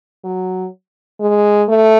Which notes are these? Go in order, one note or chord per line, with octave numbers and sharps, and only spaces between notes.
F#3
G#3
A3